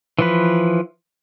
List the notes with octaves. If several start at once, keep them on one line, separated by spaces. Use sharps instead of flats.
E3 F3 B4